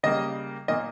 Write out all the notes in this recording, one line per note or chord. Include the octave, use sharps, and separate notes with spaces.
C#3 G3 A#3 D#5
A#2 A#3 D#5